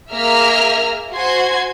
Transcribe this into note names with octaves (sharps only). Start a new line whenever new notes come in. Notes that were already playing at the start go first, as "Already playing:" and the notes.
A#3 G#4 E5 A#5 F6
F#4 C5 G#5 C6 G#6